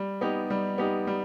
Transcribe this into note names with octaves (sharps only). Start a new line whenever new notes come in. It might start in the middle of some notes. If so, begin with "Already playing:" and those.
Already playing: G3
B3 D#4 G4
G3
B3 D#4 G4
G3